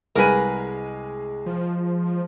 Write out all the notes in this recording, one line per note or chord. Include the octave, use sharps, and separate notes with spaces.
C2 G#3 A#4 B4 G#5 D#7
F3